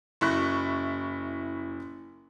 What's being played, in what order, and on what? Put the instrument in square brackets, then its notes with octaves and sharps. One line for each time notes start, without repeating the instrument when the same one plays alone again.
[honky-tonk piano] F#1 E4 C#6 F#6